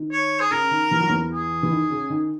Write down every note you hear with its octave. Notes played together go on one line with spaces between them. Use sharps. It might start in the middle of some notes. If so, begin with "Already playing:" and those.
Already playing: D#3
C#5
G#4
C#3 A#4
D#3
E3
F#3
E2 E3
G#4
E3
D#3
C#3
D#3